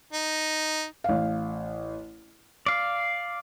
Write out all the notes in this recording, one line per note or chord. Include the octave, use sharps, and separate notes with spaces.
D#4
A1 F5
D5 F5